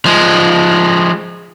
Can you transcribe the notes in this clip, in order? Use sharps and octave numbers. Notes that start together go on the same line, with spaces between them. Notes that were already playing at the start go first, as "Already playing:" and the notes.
F3 G#3